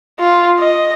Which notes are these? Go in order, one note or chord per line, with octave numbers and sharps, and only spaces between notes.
F4
D#5